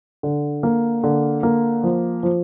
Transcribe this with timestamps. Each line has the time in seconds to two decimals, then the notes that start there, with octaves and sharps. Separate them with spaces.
0.23 D3
0.63 A#3
1.04 D3
1.43 A#3
1.83 F3
2.23 F3